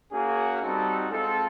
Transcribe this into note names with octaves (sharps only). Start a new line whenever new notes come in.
A#3 C#4 F#4 G#4
G3 C4 D#4 F#4 A4
G#3 C4 F4 A4